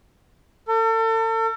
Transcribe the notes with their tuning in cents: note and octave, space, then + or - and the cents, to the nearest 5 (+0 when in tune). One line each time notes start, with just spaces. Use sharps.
A4 +40